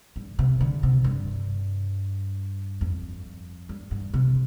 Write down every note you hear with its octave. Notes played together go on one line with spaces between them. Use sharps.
G2
C3
D3
C3
G2
F2
G2
G2
C3